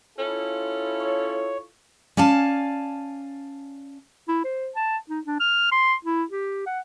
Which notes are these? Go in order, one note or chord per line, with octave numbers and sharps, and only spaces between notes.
C#4 E4 F4 A4
C#5
C#4 D5 F5 G#5 A5
E4
C5
A5
D#4
D4
F6
C6
E4
G4
F#5